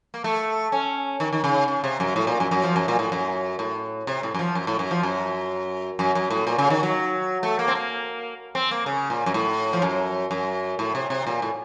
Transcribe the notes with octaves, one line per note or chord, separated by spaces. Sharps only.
A#3
A3
C#4
D#3
D#3
C#3
C#3
C3
F#2
A2
A#2
F#2
F#2
F3
F#2
A#2
A2
F#2
A2
C3
A2
F#2
F3
F#2
A2
F#2
F3
F#2
F#2
F#2
A2
A#2
C#3
D#3
F#3
A3
A#3
C4
A#3
C4
A#3
C#3
A#2
F#2
A2
F3
F#2
F#2
A2
C3
C3
A#2
A2